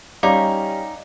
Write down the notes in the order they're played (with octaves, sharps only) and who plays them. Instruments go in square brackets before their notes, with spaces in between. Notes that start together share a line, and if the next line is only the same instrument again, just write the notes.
[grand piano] G3 C#4 G4 [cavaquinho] D#4 [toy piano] D5 F5 D6